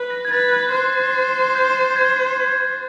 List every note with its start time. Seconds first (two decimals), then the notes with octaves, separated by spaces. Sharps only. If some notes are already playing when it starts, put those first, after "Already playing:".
Already playing: B4
0.10 A#6
0.25 G#6
0.31 B4 A6
0.52 G#6
0.72 C5 F#6
1.55 G6
1.96 G#6